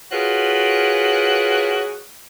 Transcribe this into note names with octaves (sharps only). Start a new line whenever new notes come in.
F4 F#4 G#4 A#4 B4 C#5